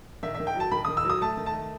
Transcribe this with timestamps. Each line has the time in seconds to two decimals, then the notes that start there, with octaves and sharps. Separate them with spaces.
0.23 D#3 E5
0.35 E5
0.40 D#3
0.47 G5
0.55 F#3 A5
0.72 D#3 B5
0.85 D#3 D#6
0.97 E6
1.05 F#3 D#6
1.21 A3 A5
1.37 D#3
1.46 A5
1.54 A3